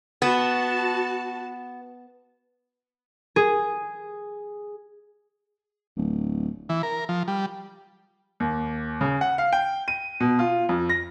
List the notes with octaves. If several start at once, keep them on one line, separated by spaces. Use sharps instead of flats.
B3 F#4 A5
G#4
D1
E3
A#4
F3
G3
D#2
C#3
F#5
F5
G5
D#7
B2
F4
F2
A#6